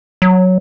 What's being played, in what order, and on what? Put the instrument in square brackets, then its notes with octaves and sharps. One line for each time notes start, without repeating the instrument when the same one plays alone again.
[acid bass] F#3